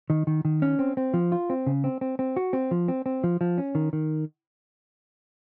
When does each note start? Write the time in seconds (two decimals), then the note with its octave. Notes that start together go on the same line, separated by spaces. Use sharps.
0.10 D#3
0.27 D#3
0.45 D#3
0.62 C#4
0.79 C4
0.97 C4
1.14 F3
1.32 F4
1.50 C4
1.67 C#3
1.84 C4
2.01 C4
2.19 C4
2.37 F#4
2.53 C4
2.71 F3
2.88 C4
3.06 C4
3.24 F3
3.41 F3
3.58 C#4
3.75 D#3
3.93 D#3